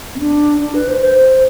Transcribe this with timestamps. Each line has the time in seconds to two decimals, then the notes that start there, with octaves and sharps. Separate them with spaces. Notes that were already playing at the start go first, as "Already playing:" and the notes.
0.15 C4
0.20 D4
0.60 D4
0.74 B4
0.88 C5
1.01 C5